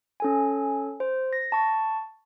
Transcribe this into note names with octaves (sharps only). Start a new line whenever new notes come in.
C#4 A4 G#5
C5
A#6
A5 C#6